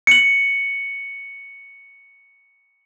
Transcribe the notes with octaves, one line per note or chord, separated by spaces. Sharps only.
C#7 F#7